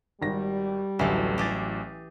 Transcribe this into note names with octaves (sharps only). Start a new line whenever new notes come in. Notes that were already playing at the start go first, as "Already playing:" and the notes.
G#1 G3 A#6
A1 D2 E3 F#3 A3
G4 G#4 D6 A6